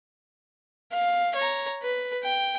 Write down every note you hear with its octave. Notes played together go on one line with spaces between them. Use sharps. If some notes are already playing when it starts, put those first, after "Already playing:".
F5
C#5 A#5
B4
G5